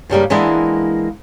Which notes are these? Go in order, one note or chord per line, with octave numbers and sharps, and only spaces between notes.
G2 C#3 G3 A#3
E3 G#3 A#3 B3 D4 E4